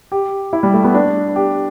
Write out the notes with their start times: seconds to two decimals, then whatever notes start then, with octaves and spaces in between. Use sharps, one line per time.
0.12 G4
0.53 E4
0.63 G3
0.74 A3
0.84 B3
0.94 D4
1.36 G4